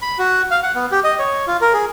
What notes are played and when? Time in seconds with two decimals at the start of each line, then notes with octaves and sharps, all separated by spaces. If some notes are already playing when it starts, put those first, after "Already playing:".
0.02 B5
0.19 F#4
0.51 F5
0.63 F#5
0.75 B3
0.92 G4
1.04 D#5
1.19 C#5
1.47 F4
1.61 A#4
1.73 G#4